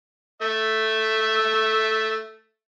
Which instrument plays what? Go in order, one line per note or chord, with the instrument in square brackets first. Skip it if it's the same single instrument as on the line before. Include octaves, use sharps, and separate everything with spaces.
[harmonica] A3 E5